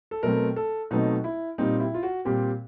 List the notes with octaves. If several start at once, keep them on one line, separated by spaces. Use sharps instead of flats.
A4
B2 F#3 A3 C4 A#4
A4
B2 F#3 A3 C4 D#4
E4
A#2 G3 C4 D#4
E4
F4
F#4
A#2 G3 C4 G4